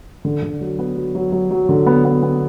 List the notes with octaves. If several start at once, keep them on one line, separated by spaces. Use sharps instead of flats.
D3
D3
F#3
B3
F#3
F#3
F#3
F#3
D3
B3
B3
B3